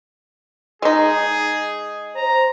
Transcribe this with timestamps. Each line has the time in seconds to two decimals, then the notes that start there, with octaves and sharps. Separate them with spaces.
0.82 G#3 D#4 G#4
2.16 C5 A#5